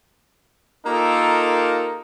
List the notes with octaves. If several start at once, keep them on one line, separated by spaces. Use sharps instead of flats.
A#3 D#4 F4 G4 A4 A#4